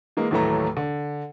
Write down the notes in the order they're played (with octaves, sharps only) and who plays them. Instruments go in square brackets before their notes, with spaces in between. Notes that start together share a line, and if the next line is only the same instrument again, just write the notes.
[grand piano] E3 G#3 A#3
D#2 A2 E3 F#3 A3 A#5
D3